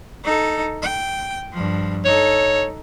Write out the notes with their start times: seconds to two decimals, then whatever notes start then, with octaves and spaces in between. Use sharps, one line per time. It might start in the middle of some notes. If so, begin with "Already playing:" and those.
0.24 D#4 A4
0.82 G5
1.53 G2 F3
2.05 D#4 A4 C#5